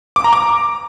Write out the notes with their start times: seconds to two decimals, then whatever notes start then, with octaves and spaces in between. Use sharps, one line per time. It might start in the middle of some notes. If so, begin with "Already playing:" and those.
0.16 D6
0.24 A#5
0.33 D6